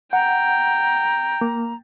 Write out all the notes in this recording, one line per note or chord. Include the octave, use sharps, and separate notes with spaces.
F#5 G5 A#5
A#3